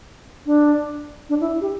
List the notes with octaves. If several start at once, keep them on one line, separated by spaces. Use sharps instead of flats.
D4
D4
E4
G4